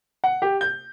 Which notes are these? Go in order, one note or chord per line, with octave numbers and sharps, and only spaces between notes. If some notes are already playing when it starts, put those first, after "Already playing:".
F#5
G4
G6